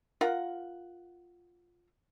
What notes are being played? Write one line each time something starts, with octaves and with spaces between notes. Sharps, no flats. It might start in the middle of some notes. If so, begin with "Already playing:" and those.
F4 A#4 F#5